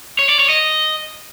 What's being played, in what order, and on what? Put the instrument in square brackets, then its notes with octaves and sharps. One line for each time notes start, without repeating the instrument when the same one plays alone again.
[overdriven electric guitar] C#5
D5
C#5
D#5